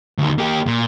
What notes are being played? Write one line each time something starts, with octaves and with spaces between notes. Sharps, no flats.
D2 D#3
A#3 G4
A#2